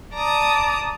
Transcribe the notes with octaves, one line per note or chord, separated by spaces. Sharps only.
D5 A5 A#5 D#6